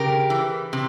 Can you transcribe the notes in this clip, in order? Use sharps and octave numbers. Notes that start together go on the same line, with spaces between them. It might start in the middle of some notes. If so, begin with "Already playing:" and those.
Already playing: C#3 G4 A#4
E3
C3